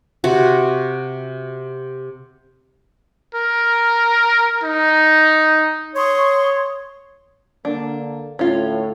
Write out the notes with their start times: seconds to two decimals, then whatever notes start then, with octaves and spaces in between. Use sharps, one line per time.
0.24 C3 F#4
3.35 A#4
4.63 D#4
5.95 C#5 C6 C#6 D#6
7.65 D3 A#3 D4
8.39 D2 A2 C#4 F4